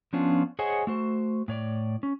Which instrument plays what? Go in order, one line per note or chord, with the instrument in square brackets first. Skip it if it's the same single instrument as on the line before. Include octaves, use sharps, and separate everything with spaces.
[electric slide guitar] F3 B3 C#4 D4 F4
G#4 C5 C#5 D#5 F#5 G#5
A3 F#4 C5
A2 C#5 D5
C#4